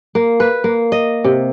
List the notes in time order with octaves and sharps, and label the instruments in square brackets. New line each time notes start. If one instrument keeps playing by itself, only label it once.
[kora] A#3
B4
A#3
D#5
C3